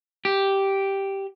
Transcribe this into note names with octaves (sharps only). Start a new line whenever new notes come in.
G4